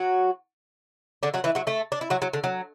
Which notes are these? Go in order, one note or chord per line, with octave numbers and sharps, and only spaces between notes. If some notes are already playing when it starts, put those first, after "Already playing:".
Already playing: F#3 F#4
D3 D4
F#3 F#4
E3 E4
F#3 F#4
A3 A4
D4
E4
F#3 F#4
F#3
D3
F#3